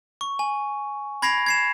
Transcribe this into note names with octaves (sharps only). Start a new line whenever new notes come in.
C#6
G#5
B5 G#6 A#6 C7 D7 F7
G#6 C7 E7